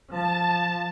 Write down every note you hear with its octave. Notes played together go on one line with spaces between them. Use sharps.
F3 A5